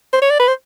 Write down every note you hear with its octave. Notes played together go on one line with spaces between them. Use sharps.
C5
C#5
D5
B4
C5